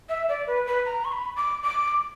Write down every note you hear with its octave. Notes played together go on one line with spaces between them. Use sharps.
E5
D5
B4
B4
A#5
C#6
B5
D6
D6